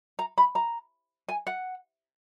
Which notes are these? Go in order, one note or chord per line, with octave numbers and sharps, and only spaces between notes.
A#5
B5
A#5
G#5
F#5